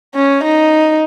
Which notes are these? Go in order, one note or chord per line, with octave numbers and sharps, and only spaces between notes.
C#4
D#4